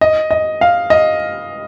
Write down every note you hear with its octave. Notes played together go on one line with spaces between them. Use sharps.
D#5
D#5
F5
D#5